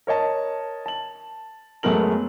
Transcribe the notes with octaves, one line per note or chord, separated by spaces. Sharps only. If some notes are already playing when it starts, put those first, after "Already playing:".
A#4 C#5 D#5 A5
A5 F#7
F#2 G#3 A3 B3 A#4 F#7